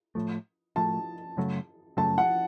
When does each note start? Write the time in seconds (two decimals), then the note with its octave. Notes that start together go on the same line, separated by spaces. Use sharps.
0.15 A2 F3 A3
0.76 A2 F3 A3 A5
1.37 F#2 C#3 F#3 A3
1.97 F#2 C#3 F#3 A3 A5
2.18 F#5